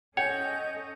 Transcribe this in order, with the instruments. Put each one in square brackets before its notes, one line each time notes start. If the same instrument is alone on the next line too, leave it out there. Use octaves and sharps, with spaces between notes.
[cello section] C#4 A4 D#5 [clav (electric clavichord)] C#5 [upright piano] F#5 G#5 [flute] G6